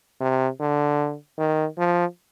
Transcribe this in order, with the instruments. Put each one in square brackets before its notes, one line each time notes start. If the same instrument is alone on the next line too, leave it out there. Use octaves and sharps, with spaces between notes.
[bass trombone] C3
D3
D#3
F3